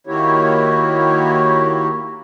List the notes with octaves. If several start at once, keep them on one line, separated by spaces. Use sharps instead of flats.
D#3 A#3 E4 F#4 G4 C#5